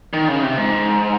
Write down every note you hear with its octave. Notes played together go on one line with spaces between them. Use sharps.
D#3
C#3
C3
G#2